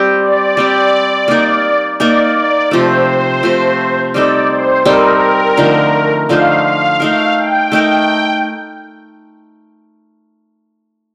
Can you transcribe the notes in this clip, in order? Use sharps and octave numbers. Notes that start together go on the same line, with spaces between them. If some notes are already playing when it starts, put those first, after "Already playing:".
Already playing: G3 C4 G4
D5
G3 C4 G4
A#3 D#4 A#4
A#3 D#4 A#4 D5
D5
C3 F3 A3 C5
C3 F3 A3
G3 C4 D#4 A4 D5
C5
G3 C4 D#4 A4 A#4
D3 F3 A3 D#4
D3 F3 A3 D#4 F5
F5
A3 D#4 A#4 F5
G5
A3 D#4 A#4